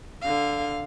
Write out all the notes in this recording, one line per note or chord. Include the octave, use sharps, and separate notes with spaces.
D3 F5